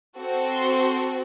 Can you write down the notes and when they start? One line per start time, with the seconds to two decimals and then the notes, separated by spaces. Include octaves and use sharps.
0.18 C4 F#4 A4
0.51 C6